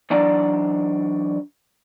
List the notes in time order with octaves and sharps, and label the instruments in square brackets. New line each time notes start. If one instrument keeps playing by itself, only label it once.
[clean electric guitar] E3 F#3 D4 D5 A#5